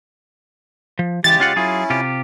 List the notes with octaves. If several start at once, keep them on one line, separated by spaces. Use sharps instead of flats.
F3
C#3 E3 G#3 G4 A6
C#4 F4 F#5
F#3 C#4 E4 F4 G#4
C3 F4 G4